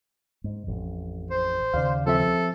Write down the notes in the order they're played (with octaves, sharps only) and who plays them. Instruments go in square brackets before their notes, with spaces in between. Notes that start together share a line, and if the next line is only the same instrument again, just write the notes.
[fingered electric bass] G#2
A1 F2
[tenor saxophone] C5
[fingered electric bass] D#2 C#3 [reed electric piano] D5 F5
[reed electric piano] F3 C4 E5 [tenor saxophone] A4